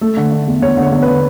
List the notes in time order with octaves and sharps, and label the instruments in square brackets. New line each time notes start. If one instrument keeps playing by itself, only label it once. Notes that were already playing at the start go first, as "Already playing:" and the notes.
[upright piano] A3 A4
D3
D3
E2
E2 C#5
D3
C#5
E2
D3 B4